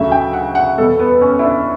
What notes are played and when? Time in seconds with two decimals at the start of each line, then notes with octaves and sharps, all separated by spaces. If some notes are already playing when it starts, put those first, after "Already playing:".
Already playing: D2 C#3 F#3 A3 E5
0.12 G5
0.33 F#5
0.55 F#5
0.78 E2 B2 G3 A4
0.99 B3
1.21 C#4
1.39 E4
1.44 D4